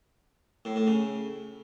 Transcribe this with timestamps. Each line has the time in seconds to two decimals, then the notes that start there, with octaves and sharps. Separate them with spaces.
0.65 A2
0.76 A2
0.87 C#3